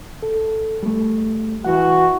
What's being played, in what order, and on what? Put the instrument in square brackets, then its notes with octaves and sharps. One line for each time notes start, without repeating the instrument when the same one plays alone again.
[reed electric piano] A4
G3 A3
[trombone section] E3 F#4 [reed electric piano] F#5